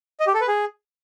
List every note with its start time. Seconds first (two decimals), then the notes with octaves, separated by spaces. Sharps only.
0.20 D#5
0.27 G4
0.34 A4
0.41 B4
0.48 G#4